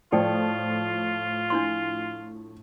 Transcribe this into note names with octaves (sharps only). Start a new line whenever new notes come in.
A2 F3 F4 A4 D5 G5
D4 E4 C6